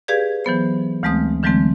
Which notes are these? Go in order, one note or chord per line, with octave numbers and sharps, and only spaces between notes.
G4 G#4 B4 D5 F5 G#6
E3 F#3 B3 C5
D2 E3 G#3 A3 C4 D#6
D3 E3 F#3 G#3 A3 C4